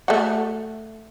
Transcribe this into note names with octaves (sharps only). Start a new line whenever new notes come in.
A3 F#4